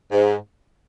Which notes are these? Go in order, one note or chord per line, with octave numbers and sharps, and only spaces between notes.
G#2